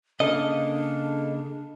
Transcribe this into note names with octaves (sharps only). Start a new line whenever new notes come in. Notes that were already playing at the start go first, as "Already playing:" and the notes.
C#3 A#3 D4 A4 D#5